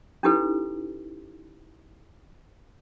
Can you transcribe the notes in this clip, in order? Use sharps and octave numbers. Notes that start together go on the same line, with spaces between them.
C#4 D#4 E4 G4 A4 B4